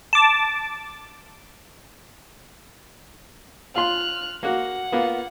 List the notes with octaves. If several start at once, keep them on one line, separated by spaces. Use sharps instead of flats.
A5 D6
F4 C6 F6 F#6
A#3 F#4 F#5
A#3 B3 F4